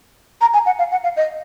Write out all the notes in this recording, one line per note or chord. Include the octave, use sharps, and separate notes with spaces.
A#5
G#5
F#5
F5
F#5
F5
D#5